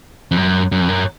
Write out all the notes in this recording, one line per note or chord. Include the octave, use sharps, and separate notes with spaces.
F2
F#2
F#2
F2
F#2